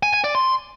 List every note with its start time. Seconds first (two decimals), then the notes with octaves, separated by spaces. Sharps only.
0.03 G#5
0.14 G#5
0.24 D5
0.35 C6